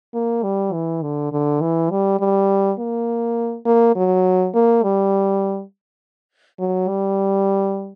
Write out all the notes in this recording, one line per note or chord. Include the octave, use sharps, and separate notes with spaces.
A#3
G3
E3
D3
D3
E3
G3
G3
A#3
A#3
F#3
A#3
G3
F#3
G3